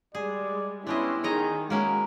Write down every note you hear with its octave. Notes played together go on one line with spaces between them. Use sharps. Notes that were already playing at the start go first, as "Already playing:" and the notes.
G3 G#3 G#4 D5
B3 C#4 D4 E4 G4 D#5 C6
D#3 G#4 C#5 D#5 A#5
G#3 A#3 C#4 E4 F#4